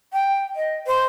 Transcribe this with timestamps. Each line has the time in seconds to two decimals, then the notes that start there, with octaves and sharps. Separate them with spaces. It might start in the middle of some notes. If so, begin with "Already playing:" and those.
0.13 G5
0.56 D#5
0.87 C5